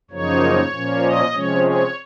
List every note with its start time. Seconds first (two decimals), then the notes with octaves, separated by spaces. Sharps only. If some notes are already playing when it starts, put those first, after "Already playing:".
0.11 F#2 C#3 F3 A#3 D#4 C#5
0.73 A#2 F3 A#3 C#4
1.03 D#5
1.33 C3 F3 G#3 C#4 C#5
1.63 C#5